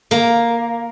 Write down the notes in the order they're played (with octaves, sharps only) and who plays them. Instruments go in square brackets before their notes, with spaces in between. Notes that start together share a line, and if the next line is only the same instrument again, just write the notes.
[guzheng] A#3